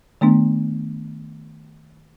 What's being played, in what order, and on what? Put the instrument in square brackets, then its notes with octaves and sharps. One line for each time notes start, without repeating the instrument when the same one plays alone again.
[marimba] D#3 A3 B3 D4